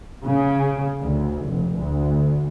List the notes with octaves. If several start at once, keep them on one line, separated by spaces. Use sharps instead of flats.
C#3
D2
F1
D2